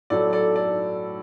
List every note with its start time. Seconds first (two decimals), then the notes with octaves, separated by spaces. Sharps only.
0.10 A2 F#3 A3 A4 D5
0.33 A4 D5
0.56 A4 D5